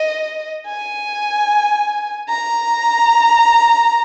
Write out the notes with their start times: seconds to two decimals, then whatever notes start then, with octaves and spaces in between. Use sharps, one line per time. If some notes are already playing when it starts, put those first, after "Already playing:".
Already playing: D#5
0.67 G#5
2.29 A#5